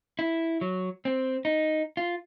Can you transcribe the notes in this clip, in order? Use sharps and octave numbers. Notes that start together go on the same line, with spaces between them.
E4
F#3
C4
D#4
F4